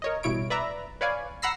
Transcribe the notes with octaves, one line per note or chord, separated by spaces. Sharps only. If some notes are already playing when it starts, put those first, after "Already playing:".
A#4 C#5 D#5
A1 G2 B2 E4 C#5 D7
B4 D5 E5 A#5
B4 C#5 D5 F5 G#5
F#5 A#5 B5 E6 A#6 C7